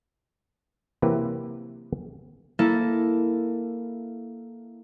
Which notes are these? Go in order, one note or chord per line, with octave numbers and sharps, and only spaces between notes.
C3 E3 F#3 A#3 G4 B4
A#3 E4 A4